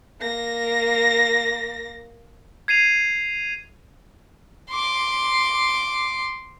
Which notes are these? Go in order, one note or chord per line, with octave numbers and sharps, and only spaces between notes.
A#3 A#6
G#6 C7 D#7 F7
C6 D6